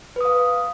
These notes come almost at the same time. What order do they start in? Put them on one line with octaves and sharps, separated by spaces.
B4 D#6 F5